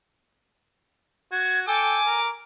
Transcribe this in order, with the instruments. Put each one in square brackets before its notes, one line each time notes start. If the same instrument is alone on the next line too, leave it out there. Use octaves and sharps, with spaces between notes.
[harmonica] F#4 [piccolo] G#6
[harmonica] A4 G5 [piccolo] G#5 [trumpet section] D6
[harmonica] A#4